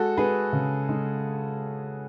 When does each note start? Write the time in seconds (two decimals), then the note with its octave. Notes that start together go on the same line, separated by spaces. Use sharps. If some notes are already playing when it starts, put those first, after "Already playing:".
Already playing: G#3 F#4 A4
0.17 G#3 G#4 B4
0.53 C#3
0.89 G#3